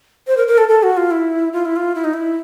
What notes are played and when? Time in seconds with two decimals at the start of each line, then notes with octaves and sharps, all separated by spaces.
0.27 C5
0.37 A#4
0.48 A#4
0.58 A4
0.69 A4
0.83 F#4
0.97 F4
1.11 E4
1.53 F4
1.65 E4
1.76 F4
1.95 E4
2.04 D#4
2.14 E4